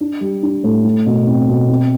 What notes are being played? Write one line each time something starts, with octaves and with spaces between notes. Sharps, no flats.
D4
G3
D4
A2
A3
B2
C4
B2
C4